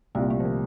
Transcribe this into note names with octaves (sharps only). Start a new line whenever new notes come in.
C2 A#2 G3 C4
A3
F3
D#3